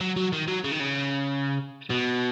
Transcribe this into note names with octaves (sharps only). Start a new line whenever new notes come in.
F#3
F#3
D#3
F#3
C#3
D#3
C#3
B2